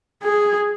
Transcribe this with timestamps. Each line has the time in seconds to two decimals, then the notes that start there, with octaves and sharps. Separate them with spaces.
0.23 G#4